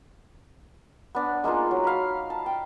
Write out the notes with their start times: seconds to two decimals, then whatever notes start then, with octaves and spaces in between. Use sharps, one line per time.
1.15 B3 D4
1.44 G#3 A#3 D#4 F4
1.71 F#3
1.84 F5 B5
2.30 A5
2.46 G5